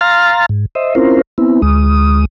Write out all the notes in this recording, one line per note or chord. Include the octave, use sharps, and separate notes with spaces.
F5 A#5 C6 F6 A6
G#2
C5 D#5 E5
C4 C#4 E4 F4 A#4 C5
B3 C4 E4
D2 G#3 D#6